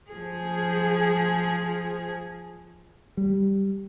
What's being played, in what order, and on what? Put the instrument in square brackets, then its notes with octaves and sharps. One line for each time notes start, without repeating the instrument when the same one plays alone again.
[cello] F3 G#4
[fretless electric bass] G3